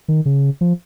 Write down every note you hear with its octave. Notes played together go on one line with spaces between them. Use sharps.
D#3
C#3
F3